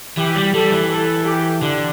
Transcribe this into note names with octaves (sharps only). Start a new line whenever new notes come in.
E3 G4
G3
G3 A4
E3
A4
G4
D3 D4